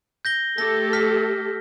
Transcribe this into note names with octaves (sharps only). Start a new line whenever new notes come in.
G6 A#6 G7
A3 G4 A4 A#6
F6 B6